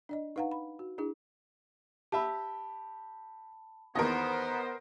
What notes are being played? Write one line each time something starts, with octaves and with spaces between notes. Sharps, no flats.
D4 D5 D#5
D#4 B4 F5 F#5 A#5
B5
F#4
D4 E4 G#4
G4 E5 A5 B5
E2 D#3 B3 A#4 C5 D#5